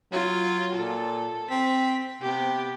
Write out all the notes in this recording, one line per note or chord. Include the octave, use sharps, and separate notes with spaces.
F#3 F4
A#2 A4
C4 B6
C3 B3 G4